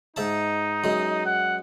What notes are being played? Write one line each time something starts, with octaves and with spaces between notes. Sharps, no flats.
G#2 D#4 E5 A5
F#2 G#3
F#5